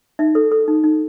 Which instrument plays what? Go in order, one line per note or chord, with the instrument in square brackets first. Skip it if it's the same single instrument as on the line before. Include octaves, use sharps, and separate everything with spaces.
[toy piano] D#4 E5
A4
A4
D#4
D#4